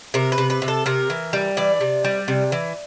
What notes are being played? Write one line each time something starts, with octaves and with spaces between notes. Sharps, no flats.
C3 A#4
B4
C3
B4
C3
A4
C3 A#4
E3
G3
E3 D5
C3
G3
C3
E3